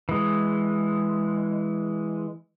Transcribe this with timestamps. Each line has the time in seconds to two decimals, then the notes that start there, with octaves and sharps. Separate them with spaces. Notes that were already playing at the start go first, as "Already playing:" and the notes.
0.09 E3 G#3